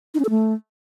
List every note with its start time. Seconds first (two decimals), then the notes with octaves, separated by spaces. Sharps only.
0.14 D#4
0.20 C#4
0.25 A4
0.30 A3